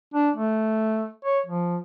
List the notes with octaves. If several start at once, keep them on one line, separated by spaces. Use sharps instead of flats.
D4
A3
C#5
F3